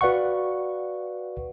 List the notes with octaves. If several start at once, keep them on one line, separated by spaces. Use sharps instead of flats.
F#4 B4 D5 F5 F#5 C#6